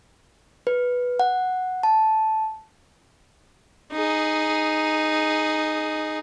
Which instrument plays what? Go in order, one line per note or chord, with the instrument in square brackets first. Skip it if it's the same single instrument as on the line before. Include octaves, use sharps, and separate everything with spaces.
[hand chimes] B4
F#5
A5
[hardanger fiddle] D#4 G#4